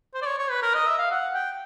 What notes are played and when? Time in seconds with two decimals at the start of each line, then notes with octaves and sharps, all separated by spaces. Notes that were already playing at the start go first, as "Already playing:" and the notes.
0.14 C5
0.22 D5
0.26 C#5
0.38 C#5
0.50 B4
0.62 A#4
0.74 D#5
0.86 E5
0.98 F5
1.11 F#5
1.34 G5